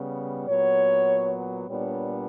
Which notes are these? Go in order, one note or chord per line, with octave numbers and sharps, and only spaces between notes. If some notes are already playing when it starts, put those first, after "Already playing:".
Already playing: C#3 G3 B3
A#2 F#3 B3 C#5
A#2 G3 B3 D4 C#5